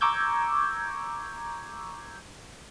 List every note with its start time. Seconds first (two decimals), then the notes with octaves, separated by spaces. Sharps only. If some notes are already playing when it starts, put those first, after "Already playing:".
0.01 A#5 C#6 D6 E6 G6 G#6